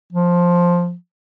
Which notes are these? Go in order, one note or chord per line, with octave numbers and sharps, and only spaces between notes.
F3